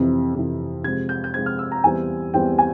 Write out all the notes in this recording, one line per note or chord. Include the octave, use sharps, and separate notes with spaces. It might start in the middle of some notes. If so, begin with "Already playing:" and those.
Already playing: F2 C3 E3
F2 C3 E3
C3 F3 G#3 C4 G#6
G6
G6
C3 F3 G#3 C4 G#6
F6
E6
A#5
E2 E3 G3 C4 G#5
E2 E3 G3 C4 G5
G#5